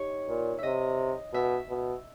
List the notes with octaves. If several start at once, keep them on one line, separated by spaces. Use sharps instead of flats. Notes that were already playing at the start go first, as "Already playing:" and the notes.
Already playing: D#4 G4 C#5
A#2
C3 D#5 E5
B2 E5
B2